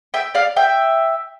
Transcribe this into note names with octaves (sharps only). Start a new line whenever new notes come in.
E5 G5
D5 F5
E5 G5